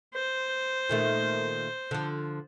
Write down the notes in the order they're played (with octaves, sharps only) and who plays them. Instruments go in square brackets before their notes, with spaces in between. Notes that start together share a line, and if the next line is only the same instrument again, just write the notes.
[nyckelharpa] C5
[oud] A#2 D#3 A3
D3 F3